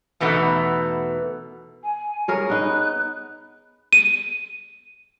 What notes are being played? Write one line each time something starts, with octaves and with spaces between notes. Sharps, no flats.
E2 B2 E3 A3 D#4
G#5
G#4 A#4 C#5
B3 D#4 F#6
D#7